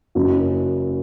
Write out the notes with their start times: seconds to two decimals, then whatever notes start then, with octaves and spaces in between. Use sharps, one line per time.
0.15 F#1 F#2 F#3